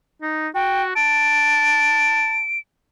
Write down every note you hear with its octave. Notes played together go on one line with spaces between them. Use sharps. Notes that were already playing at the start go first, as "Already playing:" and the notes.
D#4
F#4 G5
A5 D7